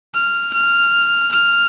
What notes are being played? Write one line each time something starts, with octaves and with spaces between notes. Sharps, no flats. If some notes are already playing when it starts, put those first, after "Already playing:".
F6
F6
F6